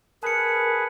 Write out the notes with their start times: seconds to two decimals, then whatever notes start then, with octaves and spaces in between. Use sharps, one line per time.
0.23 G#4 A#4 B4 A5 C#7